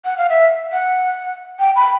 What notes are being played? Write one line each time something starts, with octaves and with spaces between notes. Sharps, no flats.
F#5
F5
E5
F#5
G5
B5